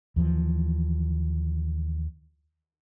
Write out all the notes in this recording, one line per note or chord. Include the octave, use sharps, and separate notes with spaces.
D#2 E3 F3